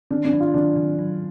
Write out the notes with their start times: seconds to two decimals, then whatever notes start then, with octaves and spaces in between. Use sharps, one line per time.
0.11 D#3 D4
0.25 D4
0.32 F#3
0.40 F4
0.54 D#3 D4
0.76 D#3
0.99 F#3